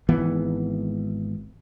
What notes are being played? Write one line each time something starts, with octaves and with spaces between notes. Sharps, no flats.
G#1 E3 B3